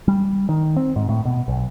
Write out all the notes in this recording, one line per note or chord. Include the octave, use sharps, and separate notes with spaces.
G3
D#3
C4
G#2
A2
B2
B1